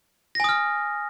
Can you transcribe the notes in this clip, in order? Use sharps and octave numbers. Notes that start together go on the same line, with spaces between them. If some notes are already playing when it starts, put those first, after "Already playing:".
G#5 D#6 F6 A#6